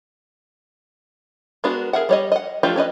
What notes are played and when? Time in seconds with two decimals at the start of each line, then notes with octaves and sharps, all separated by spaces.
1.64 G#3 B3 D4 F#4 A#4
1.93 G#4 A#4 E5 F#5
2.09 G3 C#5 D#5
2.32 D#5 F#5
2.63 F3 A3 D4 F4 G4
2.76 C#4 D4 B4 D#5